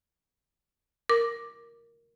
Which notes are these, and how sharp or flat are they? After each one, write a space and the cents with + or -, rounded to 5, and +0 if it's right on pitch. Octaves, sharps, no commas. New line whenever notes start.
A#4 +0 D6 +0